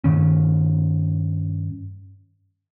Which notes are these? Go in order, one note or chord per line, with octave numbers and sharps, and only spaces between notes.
G2 D#3 C#4